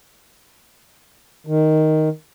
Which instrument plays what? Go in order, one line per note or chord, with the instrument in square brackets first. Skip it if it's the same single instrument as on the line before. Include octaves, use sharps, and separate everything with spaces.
[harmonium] D#3